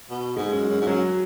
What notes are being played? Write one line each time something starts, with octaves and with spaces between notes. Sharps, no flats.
B2
G#2 G#3
F#2
F#2
G#2
F#2 F#3